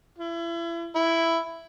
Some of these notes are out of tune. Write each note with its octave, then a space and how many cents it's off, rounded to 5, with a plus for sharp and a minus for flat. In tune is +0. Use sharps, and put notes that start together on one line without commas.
E4 +35
E4 +5